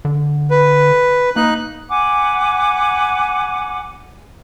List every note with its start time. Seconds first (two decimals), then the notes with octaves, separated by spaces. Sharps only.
0.05 D3
0.51 B4
1.36 A#3 D#4 F#6
1.89 F#5 G#5 B5 D6